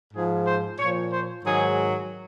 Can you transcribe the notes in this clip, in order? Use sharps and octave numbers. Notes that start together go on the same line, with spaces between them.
G#2 F3 G#4
C5
A#2 F3 C#5
C5
G#2 D#3 F#3 G#4